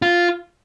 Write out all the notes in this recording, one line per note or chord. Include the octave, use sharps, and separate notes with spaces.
F4